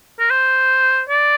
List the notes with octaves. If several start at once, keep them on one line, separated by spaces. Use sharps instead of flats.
A#4
C5
D5